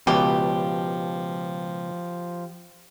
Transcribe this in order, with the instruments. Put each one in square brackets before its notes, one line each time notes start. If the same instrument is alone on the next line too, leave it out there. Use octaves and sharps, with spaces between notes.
[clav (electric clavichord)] C#2 B2 [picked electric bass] F3 [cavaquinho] G4